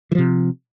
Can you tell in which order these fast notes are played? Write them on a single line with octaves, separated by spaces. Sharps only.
E3 F3 C3